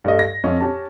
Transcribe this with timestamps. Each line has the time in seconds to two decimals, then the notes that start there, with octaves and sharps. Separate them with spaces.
0.04 G2 A3 D#5
0.19 A#6
0.44 F2 C#4 F4 D#5 C#6
0.61 C#4 G4 A5